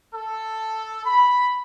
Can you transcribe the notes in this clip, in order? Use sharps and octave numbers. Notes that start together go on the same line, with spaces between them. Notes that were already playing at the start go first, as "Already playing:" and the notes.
A4
B5